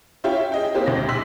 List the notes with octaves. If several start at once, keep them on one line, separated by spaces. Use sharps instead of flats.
C#4 E4 F4 G4 E5 G5
G#4 D#5 G5
A#3 C4 D#4 E4 G4 C5
D2 G#2 A#6
A#1 C6 E6 B6 F#7